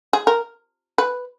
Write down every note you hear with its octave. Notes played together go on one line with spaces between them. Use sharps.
G#4
A#4
B4